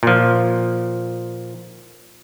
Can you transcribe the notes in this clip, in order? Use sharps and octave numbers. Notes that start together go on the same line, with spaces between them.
A#2 F3